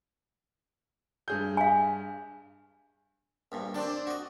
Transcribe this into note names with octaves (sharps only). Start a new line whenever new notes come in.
G2 G#4 G6
F5 G#5
A#1 G2 A#2
C4 D4 D5 G5
F#4 D#5